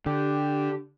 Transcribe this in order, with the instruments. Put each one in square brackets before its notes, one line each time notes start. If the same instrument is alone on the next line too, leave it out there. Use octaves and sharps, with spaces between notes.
[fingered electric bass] D3 [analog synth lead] G4